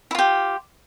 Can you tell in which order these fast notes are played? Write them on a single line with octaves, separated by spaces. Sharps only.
E4 F4 G4